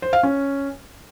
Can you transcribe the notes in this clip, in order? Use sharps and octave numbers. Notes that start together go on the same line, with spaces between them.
C5
F5
C#4